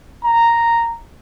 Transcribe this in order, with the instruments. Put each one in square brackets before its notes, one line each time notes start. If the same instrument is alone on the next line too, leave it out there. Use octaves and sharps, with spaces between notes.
[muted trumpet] A#5